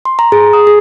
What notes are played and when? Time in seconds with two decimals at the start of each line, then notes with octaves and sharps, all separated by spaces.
0.05 C6
0.19 A#5
0.32 G#4
0.53 D#6
0.67 G#4